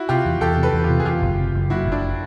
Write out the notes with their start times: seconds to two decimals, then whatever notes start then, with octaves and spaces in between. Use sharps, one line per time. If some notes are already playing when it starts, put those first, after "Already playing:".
Already playing: E4 F#4
0.09 C3 F4 G4
0.25 E2
0.41 E2 G4 A4
0.57 C3
0.63 A4 B4
0.73 E2
0.84 F4 G4
0.90 C3
1.00 G#4
1.05 E2 F4 G4
1.22 F#1
1.38 C3
1.54 F#1
1.70 F#1 E4 F#4
1.86 F#1
1.92 D4 E4